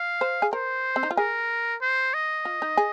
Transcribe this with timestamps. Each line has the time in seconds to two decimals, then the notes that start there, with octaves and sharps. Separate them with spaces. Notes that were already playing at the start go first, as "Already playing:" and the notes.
Already playing: F5
0.21 C5
0.42 G#4
0.53 A#4 C5
0.96 C4
1.03 D#4
1.11 F4
1.17 G#4 A#4
1.82 C5
2.14 D#5
2.45 F4
2.62 D#4
2.77 G#4